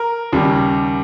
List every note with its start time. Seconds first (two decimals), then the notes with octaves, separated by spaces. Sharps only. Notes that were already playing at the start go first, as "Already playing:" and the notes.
Already playing: A#4
0.33 D#2 C#3 G3